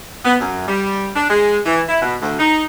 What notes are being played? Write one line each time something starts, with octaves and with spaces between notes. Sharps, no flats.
B3
F#2
G3
D4
G#3
E3
E4
B2
D2
D#4